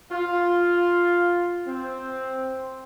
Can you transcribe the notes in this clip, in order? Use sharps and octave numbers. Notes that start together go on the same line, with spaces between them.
F4
C4